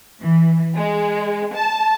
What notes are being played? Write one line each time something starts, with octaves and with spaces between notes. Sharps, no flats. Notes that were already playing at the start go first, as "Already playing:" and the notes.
E3
G#3
A5